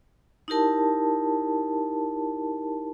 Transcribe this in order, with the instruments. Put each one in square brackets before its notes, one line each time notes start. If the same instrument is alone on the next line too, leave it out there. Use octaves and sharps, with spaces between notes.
[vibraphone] D#4 E4 G4 A#4 A5